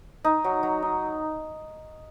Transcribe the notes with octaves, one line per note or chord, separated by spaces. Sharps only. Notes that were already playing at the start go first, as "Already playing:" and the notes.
D#4
F#3
F#3
D#4